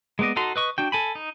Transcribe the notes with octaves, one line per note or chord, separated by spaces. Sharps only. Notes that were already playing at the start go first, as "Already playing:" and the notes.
G#3 A#3 B3 D5 D#5
D#4 F#4 A4 A#5 C6
B4 D#5 C#6
D4 F#4 G5
A4 G#5 B5
D#4